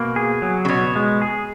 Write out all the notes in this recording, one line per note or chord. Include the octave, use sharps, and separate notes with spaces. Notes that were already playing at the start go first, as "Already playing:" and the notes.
Already playing: B2 A#3
G#4
F#3
C#3
B2 C#5
G#3
G#4